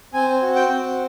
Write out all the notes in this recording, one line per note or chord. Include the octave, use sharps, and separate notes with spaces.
C4 G#5
F#4
G5
C4